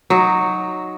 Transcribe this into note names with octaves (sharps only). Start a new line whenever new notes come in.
F#3 D#4